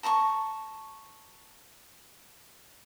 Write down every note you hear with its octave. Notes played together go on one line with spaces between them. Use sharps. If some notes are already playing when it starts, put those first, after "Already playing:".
A5 A#5 C6 C#6